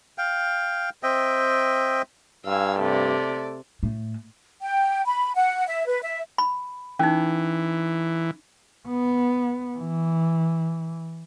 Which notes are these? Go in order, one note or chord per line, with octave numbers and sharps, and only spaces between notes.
F5 G5
C4 D#5 E5 G5
G2 F5 G#5 E6
C3 A3 D5
A2
G5
B5
F#5
E5
B4
E5
B5
E3 C#4 D#4
B3
E3